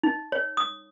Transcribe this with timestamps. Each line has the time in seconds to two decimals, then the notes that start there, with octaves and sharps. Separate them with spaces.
0.03 D#4
0.32 C#5
0.57 D#6